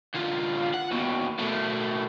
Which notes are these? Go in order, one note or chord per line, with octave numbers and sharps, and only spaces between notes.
D2 F4
F#5
D#2 B2
B2 A3